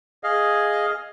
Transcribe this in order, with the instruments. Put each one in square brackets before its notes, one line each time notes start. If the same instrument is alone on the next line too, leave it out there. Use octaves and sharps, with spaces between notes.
[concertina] G#4 D#5 F5